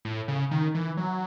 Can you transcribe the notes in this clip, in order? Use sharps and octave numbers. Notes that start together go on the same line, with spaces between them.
A2
C#3
D#3
E3
F#3